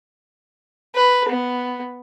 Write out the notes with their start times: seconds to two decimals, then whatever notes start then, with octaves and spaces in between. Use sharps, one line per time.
0.95 B4
1.29 B3